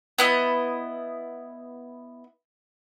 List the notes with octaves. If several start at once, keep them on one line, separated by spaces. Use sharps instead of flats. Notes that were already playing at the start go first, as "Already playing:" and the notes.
B3 E4 D#5